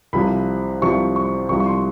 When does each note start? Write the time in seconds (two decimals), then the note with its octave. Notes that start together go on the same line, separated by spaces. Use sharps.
0.13 C2 C3 F3 B5
0.82 C2 C3 F3 C#6
1.16 C#6
1.49 C2 C3 F3 C#6
1.60 C#6
1.66 C6